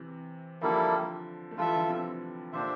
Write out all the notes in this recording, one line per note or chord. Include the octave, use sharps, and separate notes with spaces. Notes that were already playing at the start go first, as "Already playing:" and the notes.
Already playing: C3 E3
D3 F3 G3 A#3 E4 A4
A3
E3 G3 F4 A4 E5
D3 F3
C3 E3
A#2 D3 D4 G4 C5 E5